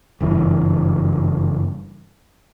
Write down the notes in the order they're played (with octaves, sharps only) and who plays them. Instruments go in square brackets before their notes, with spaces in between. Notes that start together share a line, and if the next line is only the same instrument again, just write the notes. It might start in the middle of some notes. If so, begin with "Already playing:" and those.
[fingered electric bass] F#1 G2 E3